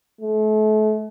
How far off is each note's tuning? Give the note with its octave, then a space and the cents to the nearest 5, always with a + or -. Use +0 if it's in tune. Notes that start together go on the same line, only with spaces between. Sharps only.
A3 -35